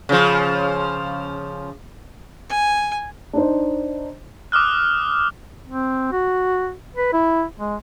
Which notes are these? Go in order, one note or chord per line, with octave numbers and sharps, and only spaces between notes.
C#3 F3
G#5
D4 D#4 C5
D6 D#6 F6 F#6
C4
F#4
B4
E4
G#3